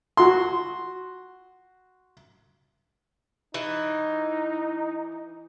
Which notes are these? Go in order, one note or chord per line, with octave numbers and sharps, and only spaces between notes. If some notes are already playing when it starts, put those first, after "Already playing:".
F#4 C6
E3 D#4